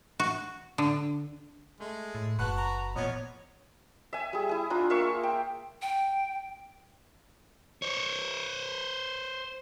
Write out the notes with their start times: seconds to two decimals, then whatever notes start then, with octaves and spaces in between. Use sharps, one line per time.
0.19 F#4
0.78 D3
1.80 G#3 A3
2.15 A2
2.39 F#1 F#4 B4 A5 F#6 F#7
2.56 A#5
2.96 E2 A#2 F3 B3 C#5 D#5
4.13 E5 G#5
4.33 G3 G#4
4.49 E4 G#5
4.70 D4 F4 A#5
4.90 A#3 F4 E5 C#6
5.23 G5
5.82 G5
7.82 C5 C#5